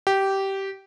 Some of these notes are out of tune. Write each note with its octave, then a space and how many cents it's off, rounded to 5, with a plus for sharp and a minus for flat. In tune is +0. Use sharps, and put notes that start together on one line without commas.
G4 -15